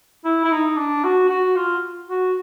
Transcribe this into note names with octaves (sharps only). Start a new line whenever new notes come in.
E4
E4
D#4
D4
F#4
F#4
F4
F#4